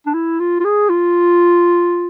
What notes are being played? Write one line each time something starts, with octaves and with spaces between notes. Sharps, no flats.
D4
E4
F4
F4
G#4
F4